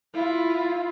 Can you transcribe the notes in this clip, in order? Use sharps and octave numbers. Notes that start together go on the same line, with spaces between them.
E4 F4